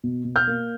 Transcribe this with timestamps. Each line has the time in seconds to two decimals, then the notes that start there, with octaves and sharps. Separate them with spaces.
0.04 B2
0.25 B2
0.36 F6 G6
0.47 A#3